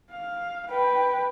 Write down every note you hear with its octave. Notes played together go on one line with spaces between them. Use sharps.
F5
B4 G5